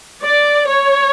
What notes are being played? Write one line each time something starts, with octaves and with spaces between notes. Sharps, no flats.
D5
C#5